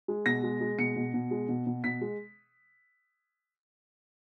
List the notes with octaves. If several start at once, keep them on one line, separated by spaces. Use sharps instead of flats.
G#3
B2 A#6
G#3
G#3
B2 C#7
B2
B2
G#3
B2
B2
B2 B6
G#3